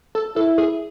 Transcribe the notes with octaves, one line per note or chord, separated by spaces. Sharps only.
A4
E4 A4
G#4